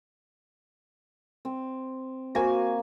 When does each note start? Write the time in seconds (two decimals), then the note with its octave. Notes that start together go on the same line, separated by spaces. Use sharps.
1.45 C4
2.35 A#3 F#4 A#4 C5 G#5